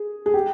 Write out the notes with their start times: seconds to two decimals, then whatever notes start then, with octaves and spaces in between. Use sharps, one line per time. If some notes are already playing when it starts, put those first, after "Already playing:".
Already playing: G#4
0.26 G#4
0.34 G4